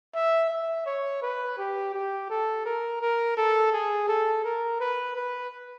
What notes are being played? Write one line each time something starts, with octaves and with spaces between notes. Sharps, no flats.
E5
E5
C#5
B4
G4
G4
A4
A#4
A#4
A4
G#4
A4
A#4
B4
B4